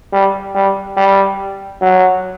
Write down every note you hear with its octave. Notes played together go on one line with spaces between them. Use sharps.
G3
G3
G3
F#3